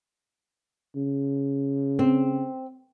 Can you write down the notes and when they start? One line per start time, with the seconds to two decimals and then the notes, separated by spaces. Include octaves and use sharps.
0.96 C#3
1.99 C4